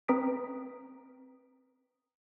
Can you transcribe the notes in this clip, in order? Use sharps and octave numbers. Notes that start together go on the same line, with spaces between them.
C4 B4 A#5 D#6 B6 D7